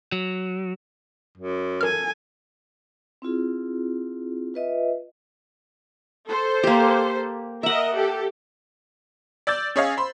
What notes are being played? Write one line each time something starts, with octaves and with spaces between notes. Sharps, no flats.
F#3
F#2
A4 A#4 G#5 F6
C4 E4 F4 G#4
F4 B4 D#5 E5
A4 C5
A#3 G4
A#4 D#5 E5 F#5
G4 A4
D5 E6 G6 A6
C#4 G#4 C#5 D#5 F5
C5 B5 C6